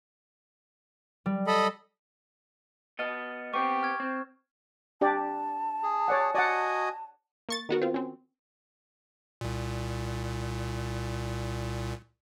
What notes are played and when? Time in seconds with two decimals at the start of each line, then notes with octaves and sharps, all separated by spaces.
1.26 G3
1.47 A4 D#5 B5
2.99 B3 D#5 F6 A6
3.54 B3 C4 G4 C#6
3.83 F6 G#6
4.00 C4
5.01 D4 G4 D5 A5
5.83 G#4
6.08 C#5 D5 F#5
6.35 F#4 D5 D#5 F#5 G#5
7.49 A#3 C#6 A6
7.69 D#3 B3 F#4 A#4
7.82 C4 F4
7.94 C4 C#4
9.41 C2 A#2